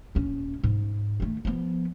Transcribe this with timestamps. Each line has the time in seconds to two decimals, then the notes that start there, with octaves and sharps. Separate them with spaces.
0.15 D#1 C#4
0.64 G#2
1.20 D#3 A3
1.45 F3 B3